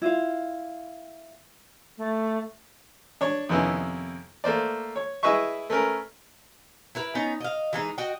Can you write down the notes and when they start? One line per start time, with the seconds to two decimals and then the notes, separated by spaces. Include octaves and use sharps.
0.02 E4 F4 F5
1.98 A3
3.21 D4 C#5
3.49 F2 C3 D#3 B3 C#4 E4
4.44 A3 A#3 C5 D5
4.96 C#5
5.23 E4 G#4 B4 D#5 E5 C#6
5.70 A3 C#4 A#4 B4
6.95 E4 A#4 B4
7.15 B3 C#4 D#4
7.40 D#5 F5
7.73 E3 G#3 D#4
7.98 F#4 D#5 G5